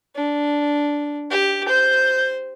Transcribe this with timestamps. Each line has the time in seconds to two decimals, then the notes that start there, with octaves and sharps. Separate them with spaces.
0.15 D4
1.31 G4
1.68 C5 G6